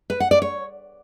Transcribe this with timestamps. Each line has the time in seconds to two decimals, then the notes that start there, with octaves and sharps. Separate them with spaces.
0.10 B4
0.20 F#5
0.31 D5
0.42 C#5